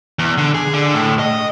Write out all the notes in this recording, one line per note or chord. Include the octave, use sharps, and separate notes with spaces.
E2
D3
G#4
D3
A2
D#5